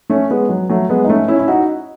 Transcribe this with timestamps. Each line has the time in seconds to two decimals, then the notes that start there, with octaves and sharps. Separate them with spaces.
0.10 A3 C#4
0.30 G#3 B3
0.49 F#3
0.69 F#3 A3
0.89 G#3 B3
1.05 D#4
1.09 A3 C#4
1.28 C#4 E4
1.39 E4
1.48 D#4 F#4